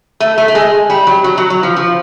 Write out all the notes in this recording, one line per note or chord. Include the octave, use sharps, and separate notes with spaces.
A3
A3
A3
G#3
G3
F#3
F#3
F#3
F#3
F3
F3